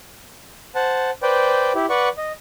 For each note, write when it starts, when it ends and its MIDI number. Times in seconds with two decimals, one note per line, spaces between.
0.75 1.11 72
0.75 1.11 78
0.75 1.11 81
1.23 1.72 71
1.23 1.72 72
1.23 1.72 74
1.23 1.72 79
1.75 1.86 64
1.75 1.86 67
1.89 2.09 71
1.89 2.09 74
1.89 2.09 78
1.89 2.09 85
2.17 2.32 75